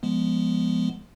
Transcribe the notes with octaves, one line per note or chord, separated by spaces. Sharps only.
F3 G#3 B3